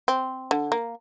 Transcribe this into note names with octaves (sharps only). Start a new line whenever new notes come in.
C4
D3
A#3